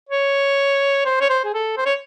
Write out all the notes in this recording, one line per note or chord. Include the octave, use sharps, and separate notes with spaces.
C#5
C5
C#5
C5
G#4
A4
C5
C#5